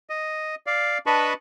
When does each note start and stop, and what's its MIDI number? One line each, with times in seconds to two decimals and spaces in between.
0.10 0.55 75
0.67 0.98 74
0.67 0.98 77
1.06 1.34 62
1.06 1.34 71
1.06 1.34 75
1.06 1.34 81
1.06 1.34 83
1.06 1.34 85